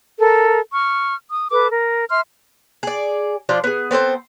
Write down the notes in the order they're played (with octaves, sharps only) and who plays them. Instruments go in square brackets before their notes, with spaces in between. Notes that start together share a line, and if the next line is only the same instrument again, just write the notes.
[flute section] A4 A#4
C#6 F6
D#6
A4 B4 D6
A#4
E5 C6 F6
[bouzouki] G#4 D5
F3 D4 F4 A#5
B3 G#4
B3 C4 A4 C5